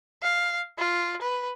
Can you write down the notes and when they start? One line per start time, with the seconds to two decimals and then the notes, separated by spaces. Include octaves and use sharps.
0.23 F5
0.79 F4
1.22 B4